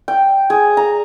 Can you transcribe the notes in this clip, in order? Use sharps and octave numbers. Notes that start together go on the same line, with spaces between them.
G5
G#4
A#5